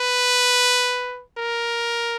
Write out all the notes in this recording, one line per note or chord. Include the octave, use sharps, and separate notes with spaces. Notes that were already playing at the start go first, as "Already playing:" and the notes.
Already playing: B4
A#4